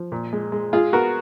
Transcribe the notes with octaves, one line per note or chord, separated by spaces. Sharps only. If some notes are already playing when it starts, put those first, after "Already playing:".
Already playing: F3
A#2
G#3
G#3
G#3 F4 G#4
B3 F#4 A#4